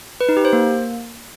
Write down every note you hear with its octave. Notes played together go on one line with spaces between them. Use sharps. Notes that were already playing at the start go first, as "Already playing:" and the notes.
B4
D#4
G4
C5
A#3